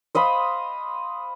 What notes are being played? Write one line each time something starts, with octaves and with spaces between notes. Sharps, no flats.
C5 D#5 F5 B5